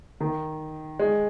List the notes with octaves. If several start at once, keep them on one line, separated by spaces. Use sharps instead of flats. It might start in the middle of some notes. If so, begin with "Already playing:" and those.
D#3
G#3